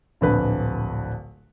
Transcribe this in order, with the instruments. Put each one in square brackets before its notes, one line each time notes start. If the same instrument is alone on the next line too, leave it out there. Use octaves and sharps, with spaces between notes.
[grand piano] D1 A#1 B4